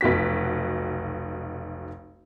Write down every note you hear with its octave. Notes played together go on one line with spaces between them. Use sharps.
F1 B1 F#4 B6